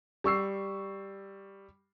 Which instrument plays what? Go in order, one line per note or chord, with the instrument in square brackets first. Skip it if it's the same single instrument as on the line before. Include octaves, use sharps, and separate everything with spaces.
[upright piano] G3 C#6 E6 C7